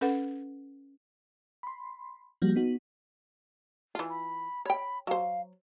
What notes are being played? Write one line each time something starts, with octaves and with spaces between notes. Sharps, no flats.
C#4 A4 B4 F#5
B5 C6
F3 G3 A#3 F#4
B3 D#4 F#4
E3 F4
B5
C#5 G5 B5
F#3 C5 F5